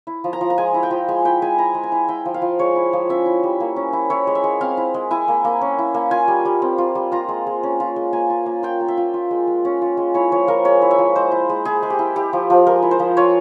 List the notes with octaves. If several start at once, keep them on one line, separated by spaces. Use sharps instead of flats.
E4
F3
A#5
F3
A#5
G#3 G#5
E4
G5
F3
G#3 G#5
E4 G5
G#3 G#5
E4 A#5
G#3
G#5
E4
E4 G5
F3
F5
F3
G#3 C#5
E4
F3
C#4 E5
E4
G3
A#3
C#4
E4
E4 C#5
G#3
E5
G#3
C4 F5
E4
G#3
E4 G#5
A#3
A#3
C#4
E4
A#3
F4 G#5
G3
G3
C4
F4
G3
F4 A#5
G#3
G#3
C#4
F4
G#3
A#3 G#5
F4
A#3
F4 G5
A#3
E5
F4
F4
G#3
G#3
C#4
F4
G#3
E4 C#5
F3 C#5
F3 A#4
G#3 C#5
E4
E5
F3
G#3 C5
E4
G#3
E4 G#4
G#3
G4
E4
E4 G4
F3
F3
G#3 A#4
E4
C5
F3
F4 C#5